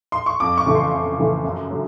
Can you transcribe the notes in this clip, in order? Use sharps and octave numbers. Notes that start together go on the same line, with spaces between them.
C6
C#6
F2 D6
C#6
C#3 E3 A3
C6
F2
C#3 E3 A3
F#2
D3 F#3 A3